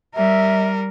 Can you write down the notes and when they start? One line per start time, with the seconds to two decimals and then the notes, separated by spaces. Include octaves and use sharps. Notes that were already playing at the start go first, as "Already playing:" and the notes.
0.15 G3 A#4 E5